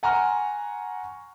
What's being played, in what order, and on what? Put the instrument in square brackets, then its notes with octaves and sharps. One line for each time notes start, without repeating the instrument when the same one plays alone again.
[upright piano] F#5 G#5 A#5 C6 C#6 F6